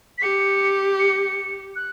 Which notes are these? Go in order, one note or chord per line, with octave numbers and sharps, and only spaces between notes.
B6
G4 C#7
C#7
F#6